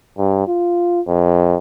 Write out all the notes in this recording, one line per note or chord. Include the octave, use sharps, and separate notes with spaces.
G2
F4
F2